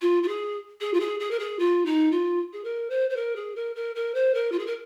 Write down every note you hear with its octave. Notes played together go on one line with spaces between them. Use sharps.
F4
F4
G#4
G#4
F4
G#4
G#4
A#4
G#4
F4
D#4
F4
G#4
A#4
C5
C5
A#4
G#4
A#4
A#4
A#4
C5
A#4
F4
G#4
A#4